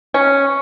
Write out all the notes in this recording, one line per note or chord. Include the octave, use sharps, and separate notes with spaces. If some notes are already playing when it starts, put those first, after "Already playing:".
C#4